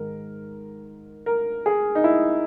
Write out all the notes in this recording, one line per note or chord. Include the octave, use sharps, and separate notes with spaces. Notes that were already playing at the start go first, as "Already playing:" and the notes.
Already playing: G#2 D#3 A#4
A#4
G#4
D#4
E4